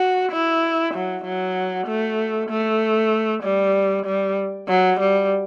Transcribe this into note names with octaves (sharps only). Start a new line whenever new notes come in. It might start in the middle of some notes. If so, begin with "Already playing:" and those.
Already playing: F#4
E4
F#3
F#3
A3
A3
G3
G3
F#3
G3